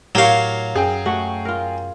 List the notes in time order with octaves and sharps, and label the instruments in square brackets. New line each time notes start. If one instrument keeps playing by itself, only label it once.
[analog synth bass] A2 [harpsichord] F#3 F5 [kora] G4 A#4 C#5
[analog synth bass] F#2 [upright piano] G#4 G5
[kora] A3 F#4
F4 A#4